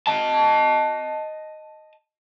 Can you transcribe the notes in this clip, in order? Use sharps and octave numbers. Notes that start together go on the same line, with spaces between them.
D#5 A5